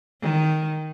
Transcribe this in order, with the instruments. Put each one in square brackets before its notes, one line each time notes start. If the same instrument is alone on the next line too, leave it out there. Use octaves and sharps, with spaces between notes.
[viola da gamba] D#3